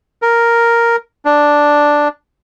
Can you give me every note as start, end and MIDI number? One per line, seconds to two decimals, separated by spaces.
0.22 0.96 70
1.25 2.08 62